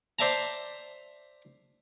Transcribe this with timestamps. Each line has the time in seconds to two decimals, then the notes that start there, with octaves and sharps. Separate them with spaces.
0.19 C5 D5 E5 A5 A#5